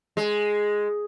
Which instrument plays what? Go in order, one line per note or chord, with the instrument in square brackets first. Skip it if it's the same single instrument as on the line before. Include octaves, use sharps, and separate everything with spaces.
[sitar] G#3